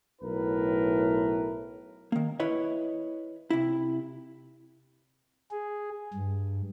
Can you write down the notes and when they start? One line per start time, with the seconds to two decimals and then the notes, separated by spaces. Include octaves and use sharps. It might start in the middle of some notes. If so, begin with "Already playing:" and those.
0.21 B1 A2 E4 A#4 B4
2.12 D#3 A#3
2.40 E4 B4 C#5 D#5
3.50 C3 E4
5.51 G#4
6.14 G2